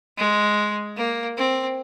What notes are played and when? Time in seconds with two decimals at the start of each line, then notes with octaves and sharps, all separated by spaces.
0.18 G#3
0.97 A#3
1.37 C4